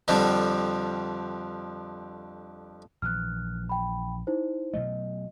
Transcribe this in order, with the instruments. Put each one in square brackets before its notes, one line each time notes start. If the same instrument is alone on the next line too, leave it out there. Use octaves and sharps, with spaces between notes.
[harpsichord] F2 D3 F3 G3
[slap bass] A#1 E3 [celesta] F6 F#6
[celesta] G5 B5
D#4 E4 C5
[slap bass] B2 F#3 A3 [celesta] D#5